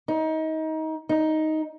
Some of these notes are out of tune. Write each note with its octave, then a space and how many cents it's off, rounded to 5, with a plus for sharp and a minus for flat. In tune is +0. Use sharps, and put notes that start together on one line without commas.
D#4 +25
D#4 +5